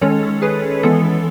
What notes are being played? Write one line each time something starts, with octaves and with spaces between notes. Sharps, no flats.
D#3 G#3 C#4 A4 C#5
G#4 B4
E3 G#3 B3 A4